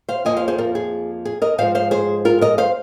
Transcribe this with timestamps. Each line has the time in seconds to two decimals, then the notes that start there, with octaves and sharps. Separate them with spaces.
0.08 C5 F5
0.25 F2 F3 A#3 F4 D#5 G#5
0.37 C5 F5
0.48 G#4 C5
0.58 F4 A#4
0.75 G#4
1.25 G#4
1.42 A#4 D#5
1.58 G#2 F3 G#3 D#4 C5 F5
1.75 C5 F5
1.91 G#4 C5
2.25 F4 A#4
2.41 A#4 D#5
2.58 C5 F5